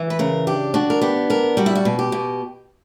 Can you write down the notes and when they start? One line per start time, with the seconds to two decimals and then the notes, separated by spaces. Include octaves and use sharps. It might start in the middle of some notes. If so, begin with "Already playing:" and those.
Already playing: E3
0.10 B4
0.19 C#3 A#4
0.47 D4 G4
0.74 D4 F#4
0.90 A#4
1.01 B3 G4
1.30 D4 A#4
1.57 G3 F#4
1.66 E4
1.75 F#4
1.85 B2
1.99 G4
2.12 B2